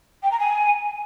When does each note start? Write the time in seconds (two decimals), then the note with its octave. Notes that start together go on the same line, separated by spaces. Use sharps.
0.23 G5
0.31 A#5
0.39 G#5